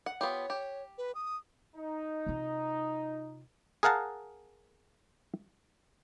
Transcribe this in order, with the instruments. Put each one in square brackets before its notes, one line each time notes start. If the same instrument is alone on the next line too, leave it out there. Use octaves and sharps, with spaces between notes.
[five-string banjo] F#5
[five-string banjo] B3 F4 G4 [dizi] C#5
[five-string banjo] G4
[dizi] B4
D#6
[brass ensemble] D#4
[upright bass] C3 F4
[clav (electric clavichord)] G#4 A#4 F5 F#5 A5 A#5